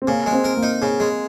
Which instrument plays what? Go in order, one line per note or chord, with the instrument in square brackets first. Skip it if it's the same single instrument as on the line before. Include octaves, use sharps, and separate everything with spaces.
[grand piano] C4
[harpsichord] C#3 [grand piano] A#3
[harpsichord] G#3
[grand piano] C4
[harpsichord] A#4
[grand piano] A#3
[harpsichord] D#4
C#3
G#3